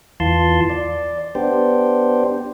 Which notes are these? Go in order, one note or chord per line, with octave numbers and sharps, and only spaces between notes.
E2 E3 F4 A5 C6
D5
B3 D4 G4 C5